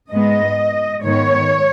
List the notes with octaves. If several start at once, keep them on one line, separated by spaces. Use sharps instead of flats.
G#2 G#3 B3 D#5
G#2 D#3 G#3 B3 C#5